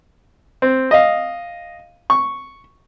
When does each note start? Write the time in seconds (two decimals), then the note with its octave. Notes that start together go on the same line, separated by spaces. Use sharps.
0.62 C4
0.91 D#5 F5
2.10 C#6